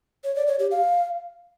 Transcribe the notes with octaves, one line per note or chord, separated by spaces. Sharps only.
C#5
D5
C#5
G4
F5